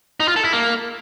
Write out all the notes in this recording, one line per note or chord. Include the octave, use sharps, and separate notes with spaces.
D#4
F4
A4
E4
A#3